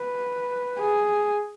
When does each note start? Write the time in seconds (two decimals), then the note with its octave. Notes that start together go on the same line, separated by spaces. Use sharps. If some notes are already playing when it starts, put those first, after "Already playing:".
Already playing: B4
0.79 G#4